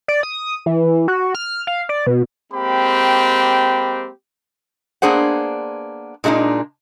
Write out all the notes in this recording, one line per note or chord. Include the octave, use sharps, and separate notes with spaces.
D5
D#6
E3
F#4
F6
F5
D5
B2
G#3 A#3 C4 G4 G5 B5
A#3 B3 D4 G#4 C5 F#5
A#2 G#3 A3 D4 D#4